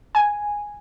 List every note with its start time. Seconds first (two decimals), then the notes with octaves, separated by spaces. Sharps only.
0.15 G#5